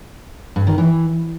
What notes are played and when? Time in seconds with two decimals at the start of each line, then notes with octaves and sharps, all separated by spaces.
0.56 G2
0.67 D#3
0.78 E3